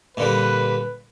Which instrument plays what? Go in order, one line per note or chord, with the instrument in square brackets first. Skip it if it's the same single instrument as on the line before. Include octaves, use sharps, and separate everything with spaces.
[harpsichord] A#2 D3 G3 [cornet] B4